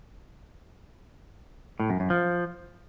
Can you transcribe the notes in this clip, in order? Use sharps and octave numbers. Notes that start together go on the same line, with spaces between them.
A2
F#2
F#2
F3